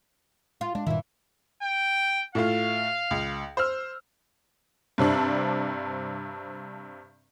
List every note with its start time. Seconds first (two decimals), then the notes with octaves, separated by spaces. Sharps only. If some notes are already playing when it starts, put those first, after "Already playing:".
0.61 F4
0.75 G#3 D4
0.87 G2 A#2 D#3 E3 E4
1.63 G5
2.35 A2 A3 F4 F5
3.11 C#2
3.57 C5 E6 F6
4.98 G2 C3 C4 D4